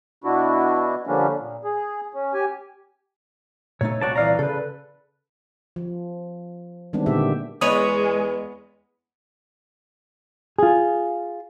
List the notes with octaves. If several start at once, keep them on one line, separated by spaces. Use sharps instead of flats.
B2 D4 E4 F#4
D3 F3 G3 A#3 C#4 D4
A#2
G#4
C#4
G4 G#5
A#2 A3 D#4 C#5
C2 A#2 F#4 C#5 D5 A5
E3 D5 F5 A#5
C#3 A4 B4
F3
D#3 G3 G#3 B3 C4 D4
A#2 D3 G4 E5
E2 G#3 B3 C#5 D#5 D#6 D#7 F7
F4 G#4